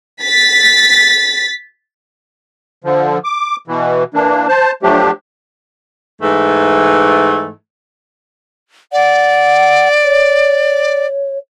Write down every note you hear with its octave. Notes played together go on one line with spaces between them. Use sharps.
A6 B6
D3 F3
D6
B2 E3
E3 A#3 D4
C5 A5
F3 F#3 A3 D4 G4
G#2 E3 A3
D5 F#5
C#5